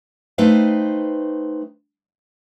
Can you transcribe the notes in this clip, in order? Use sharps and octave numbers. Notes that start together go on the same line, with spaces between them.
A3 D#4 B4 C5 F5 G5